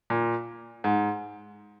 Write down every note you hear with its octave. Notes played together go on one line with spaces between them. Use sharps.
A#2
G#2